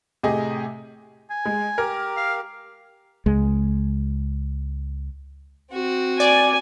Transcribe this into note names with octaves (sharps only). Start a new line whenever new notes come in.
A2 C3 G4 G#4 D#5
G#5
G#3
G4 A#4
F5
C#2 G#3
C4 F#4
D5 G#5